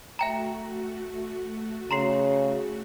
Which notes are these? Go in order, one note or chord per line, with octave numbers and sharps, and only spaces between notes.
A3 F#4 E5 G5 A#5
C#3 A#5 C6 C7